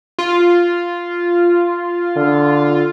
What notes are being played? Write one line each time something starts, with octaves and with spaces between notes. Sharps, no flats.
F4
D3